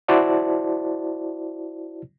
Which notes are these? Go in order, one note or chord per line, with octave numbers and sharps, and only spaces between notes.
E4 F#4 C5 D5 A5